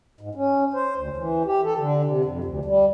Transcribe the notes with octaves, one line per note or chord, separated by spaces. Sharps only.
G#2
C#4
C5
D2
E3
G4
A4
D3
C3
F2
D2
G3